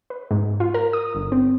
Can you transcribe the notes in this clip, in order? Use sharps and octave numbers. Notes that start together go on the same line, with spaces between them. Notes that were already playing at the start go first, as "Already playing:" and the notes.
B4
G#2
F4
A#4
D#6
G1
C4